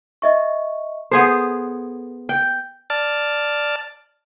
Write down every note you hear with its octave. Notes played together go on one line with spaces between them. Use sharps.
D#5 E5 C#6
B3 G#4 A4 C5
G5
D5 A5 F6